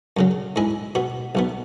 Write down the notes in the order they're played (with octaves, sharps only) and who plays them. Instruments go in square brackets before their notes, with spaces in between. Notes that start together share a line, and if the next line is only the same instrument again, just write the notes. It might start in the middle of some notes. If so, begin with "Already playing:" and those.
[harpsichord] F#2 C#3 F#3
G#2 G#3 E4 G#4
B2 B3 F#4
B1 B2 B3